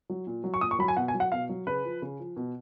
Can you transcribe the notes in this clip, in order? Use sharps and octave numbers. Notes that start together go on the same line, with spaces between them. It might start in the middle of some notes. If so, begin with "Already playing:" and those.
F#3
A#2
F#3
C#6
A#2 D#6
C#6
F#3 B5
G#5
B2 F#5
G#5
F#3
F#5
B2 F5
F#3
C#3 B4
F3
C#3
F3
B2